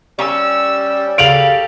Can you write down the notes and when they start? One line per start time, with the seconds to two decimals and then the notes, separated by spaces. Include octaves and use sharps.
0.19 G3 C#4 E6
1.18 C#3 G4 A4 F5 D7 F7 F#7